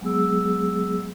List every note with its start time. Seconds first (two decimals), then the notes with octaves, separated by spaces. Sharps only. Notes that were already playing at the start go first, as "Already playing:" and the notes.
0.01 F#3 G#3 B3 G#4 E6